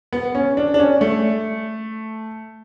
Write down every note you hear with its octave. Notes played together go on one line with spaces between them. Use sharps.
B3
C#4
D4
D4
C#4
A3